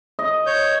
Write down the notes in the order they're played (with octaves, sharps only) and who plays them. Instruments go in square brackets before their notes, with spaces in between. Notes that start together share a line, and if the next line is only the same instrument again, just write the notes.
[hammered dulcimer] D#5
[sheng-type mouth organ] C#5 G6